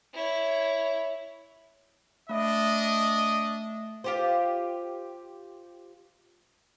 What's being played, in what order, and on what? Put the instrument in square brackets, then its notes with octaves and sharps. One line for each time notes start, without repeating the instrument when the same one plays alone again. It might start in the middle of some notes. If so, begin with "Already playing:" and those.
[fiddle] E4 C#5
[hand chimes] A3 E5 [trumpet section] D4 D#5
[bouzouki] F4 G4 C5